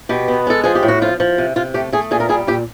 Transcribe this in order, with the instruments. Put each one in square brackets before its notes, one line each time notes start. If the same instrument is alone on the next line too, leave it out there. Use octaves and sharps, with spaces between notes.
[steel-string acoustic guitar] B2 G4
B3
G#3 A4
F3 G#4
G4
A2
F#4
F3 F4
F3
C3
C3 F4
A3 G4
A3 G#4
A#2 G#4
A#4
G3 G#4
A#2 G4